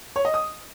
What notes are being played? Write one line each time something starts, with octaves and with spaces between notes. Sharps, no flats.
C#5
D#5
D#6